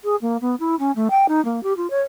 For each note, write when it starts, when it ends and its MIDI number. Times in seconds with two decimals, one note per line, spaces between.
0.04 0.16 68
0.21 0.37 58
0.41 0.55 59
0.60 0.75 64
0.79 0.91 61
0.96 1.08 57
1.10 1.26 79
1.28 1.43 63
1.45 1.62 58
1.63 1.73 67
1.77 1.89 65
1.90 2.01 73